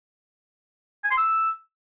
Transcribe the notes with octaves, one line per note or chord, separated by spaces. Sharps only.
G#5
C6
E6